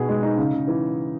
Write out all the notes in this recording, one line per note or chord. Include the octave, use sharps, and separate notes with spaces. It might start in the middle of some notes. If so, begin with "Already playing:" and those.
Already playing: B2 F#4 G#4
G#3
D#4
C#3
C#3
E3